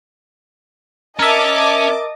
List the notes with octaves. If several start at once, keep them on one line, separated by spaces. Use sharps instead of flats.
C#4 A#4 D#5 E5 A5 D6